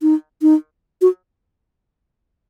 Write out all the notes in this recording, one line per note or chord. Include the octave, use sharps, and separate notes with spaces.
D#4
D#4
F#4